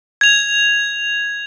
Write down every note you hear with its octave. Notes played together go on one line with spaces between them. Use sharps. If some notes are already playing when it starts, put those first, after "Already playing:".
G#6 F7